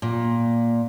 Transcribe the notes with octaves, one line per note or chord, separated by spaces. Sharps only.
A#2